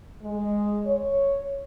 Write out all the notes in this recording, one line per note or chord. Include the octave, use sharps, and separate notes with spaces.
G#3
C#5